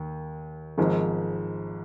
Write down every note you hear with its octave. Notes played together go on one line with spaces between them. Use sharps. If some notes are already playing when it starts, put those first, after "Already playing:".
Already playing: D#2
G#1 G#2 F3